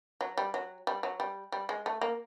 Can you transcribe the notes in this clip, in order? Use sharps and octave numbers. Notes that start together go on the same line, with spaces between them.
F#3
G3
F#3
G3
F#3
G3
G3
G#3
A3
A#3